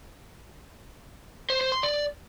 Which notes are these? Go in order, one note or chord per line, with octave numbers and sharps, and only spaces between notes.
C5
C5
C6
D5